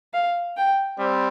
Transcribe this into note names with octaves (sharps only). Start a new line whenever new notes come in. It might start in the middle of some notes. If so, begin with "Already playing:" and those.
F5
G5
G3 C4